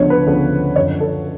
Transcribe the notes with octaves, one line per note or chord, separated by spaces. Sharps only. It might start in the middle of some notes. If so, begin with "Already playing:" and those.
Already playing: D2 C#3 F3 B3 D4 C#5
B4
D2 C#3 F3 B3 D4
F#2 D3 F3 C#5
A4